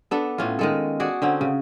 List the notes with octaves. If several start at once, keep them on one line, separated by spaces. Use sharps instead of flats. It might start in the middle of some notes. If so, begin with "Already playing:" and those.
B3 D4 A4
A2 C#4 F4
D#3 G#3 A4
F#4 G#4 D5
D3 C4 C#4
C#3